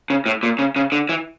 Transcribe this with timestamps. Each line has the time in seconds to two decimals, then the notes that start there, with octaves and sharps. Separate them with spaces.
0.10 C#3
0.26 A2
0.43 A#2
0.59 C#3
0.76 C#3
0.92 D3
1.09 E3